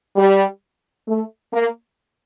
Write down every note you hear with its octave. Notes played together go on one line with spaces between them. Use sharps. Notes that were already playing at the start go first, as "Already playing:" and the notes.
G3
A3
A#3